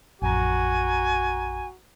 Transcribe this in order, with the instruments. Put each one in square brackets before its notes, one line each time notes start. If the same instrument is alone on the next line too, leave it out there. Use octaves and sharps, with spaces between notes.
[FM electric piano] A1 F2 A#5 [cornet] F#4 [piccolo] G#5